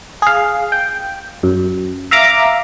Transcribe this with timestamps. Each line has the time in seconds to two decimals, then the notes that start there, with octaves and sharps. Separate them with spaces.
0.22 G#4 F5
0.72 G5
1.43 F#2
2.11 E5 F5 A#5 D6